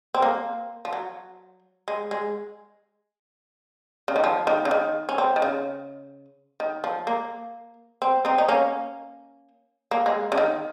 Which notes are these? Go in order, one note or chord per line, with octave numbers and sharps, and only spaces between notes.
C4
A#3
F3
F#3
G#3
G#3
C#3
D#3
F3
D#3
C#3
D#3
C#4
C4
D#3
C#3
D#3
F3
A#3
C4
C4 D#4
D#4
A#3 C#4
A#3
G#3
C#3
D#3